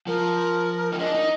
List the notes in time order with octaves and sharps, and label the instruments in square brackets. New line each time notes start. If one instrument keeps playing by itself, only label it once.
[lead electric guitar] F3 [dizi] A#4
[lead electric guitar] D#4
[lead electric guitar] D4 [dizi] D#5
[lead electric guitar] D#4